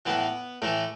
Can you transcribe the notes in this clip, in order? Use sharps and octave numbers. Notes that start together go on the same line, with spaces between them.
A2 E3 B3
A2 E3 A3